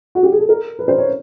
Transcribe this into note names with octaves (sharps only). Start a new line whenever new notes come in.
F#4
G4
G#4
A4
A#4
B4
C5
C#5